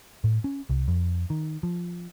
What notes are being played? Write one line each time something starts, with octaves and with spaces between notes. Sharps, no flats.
A2
C#4
C2
F2
D#3
F3